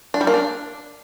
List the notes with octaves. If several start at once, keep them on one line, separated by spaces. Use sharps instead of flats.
D4
G3
A#3
D4